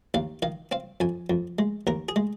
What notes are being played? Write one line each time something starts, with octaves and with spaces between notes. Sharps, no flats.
D#2 F5
D#3 F5
C4 F5
F2 G#5
F2
G#3
D#2 A#4
G#4
G#3